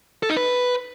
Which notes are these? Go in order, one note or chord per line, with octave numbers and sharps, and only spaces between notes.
A4
D#4
B4